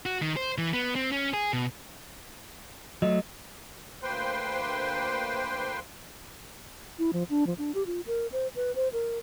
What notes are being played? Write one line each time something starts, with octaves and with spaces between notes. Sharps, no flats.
F#4
D#3
C5
E3
B3
C4
C#4
G#4
B2
F#3 A3 D#5
D2 A#3 B4 C5 G5 C6
E4
F3
D4
F3
D4
G4
F4
A#4
C5
B4
C5
A#4